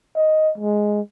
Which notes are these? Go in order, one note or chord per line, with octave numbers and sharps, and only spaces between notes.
D#5
G#3